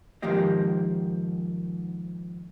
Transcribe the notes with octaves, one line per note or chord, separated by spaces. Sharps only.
G#2 D#3 F3 A#3 G4 D#5